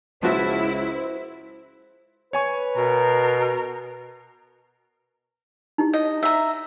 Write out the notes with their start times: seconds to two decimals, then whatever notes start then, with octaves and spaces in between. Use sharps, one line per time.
0.23 C#2 F3 B3 E4 F#4 C5
2.33 B4 C#5 G#5 C#6
2.77 B2 A#4
5.78 D#4 E4 G4
5.93 C#5 D#5
6.23 C#5 E5 A#5